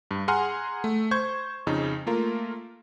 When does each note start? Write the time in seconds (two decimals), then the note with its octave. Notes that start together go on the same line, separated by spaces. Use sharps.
0.11 G2
0.28 G#4 F#5 G#5 A#5 C6 F6
0.84 A3
1.11 C5 C#6 G6 G#6
1.67 F2 C#3 D#4
2.06 A3 A#3 F4 A#4